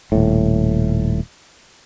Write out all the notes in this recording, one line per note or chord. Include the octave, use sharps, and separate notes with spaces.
D#1 A2